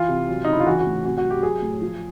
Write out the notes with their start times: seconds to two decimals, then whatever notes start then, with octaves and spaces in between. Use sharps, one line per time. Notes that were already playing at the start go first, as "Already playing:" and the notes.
Already playing: E3 F4
0.08 C3
0.29 F#3
0.45 D#4
0.48 C#3
0.53 E4
0.60 F4
0.66 E3 F#4
0.79 F#4
0.86 A2
1.05 C3 F#4
1.18 F#4
1.24 F#3
1.30 G4
1.42 F#3 G#4
1.62 A2
1.82 F3